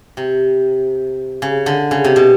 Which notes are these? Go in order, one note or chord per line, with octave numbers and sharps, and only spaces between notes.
C3
C#3
D3
C#3
C3
B2